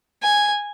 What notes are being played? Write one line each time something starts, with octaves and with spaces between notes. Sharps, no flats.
G#5